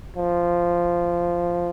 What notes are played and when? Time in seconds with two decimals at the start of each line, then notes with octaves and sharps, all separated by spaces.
0.17 F3